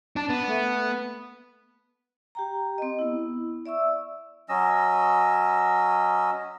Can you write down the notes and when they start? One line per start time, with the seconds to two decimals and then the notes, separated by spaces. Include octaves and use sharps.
0.16 D4 A5
0.29 B3
0.48 A3
2.35 G4 G5 A#5
2.78 C4 D#5
2.99 B3 E4
3.66 D5 E5 C#6 E6
4.49 F#3 C#4 D#5 E6